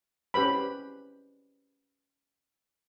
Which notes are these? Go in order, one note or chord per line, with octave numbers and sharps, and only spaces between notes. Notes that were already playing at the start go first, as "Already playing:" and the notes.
C#4 G4 B4 C5 B5